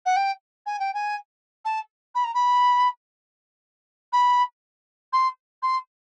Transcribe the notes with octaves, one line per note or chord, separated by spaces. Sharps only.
F#5
G5
G#5
G5
G#5
A5
B5
A#5
B5
B5
C6
C6